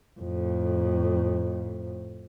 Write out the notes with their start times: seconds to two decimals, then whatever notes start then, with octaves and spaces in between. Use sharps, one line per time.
0.20 F2 A2